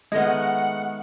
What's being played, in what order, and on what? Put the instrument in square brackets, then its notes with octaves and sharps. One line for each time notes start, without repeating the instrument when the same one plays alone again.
[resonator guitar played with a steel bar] D#3 D#5 [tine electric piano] G#3 [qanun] A3 B3 [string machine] F#5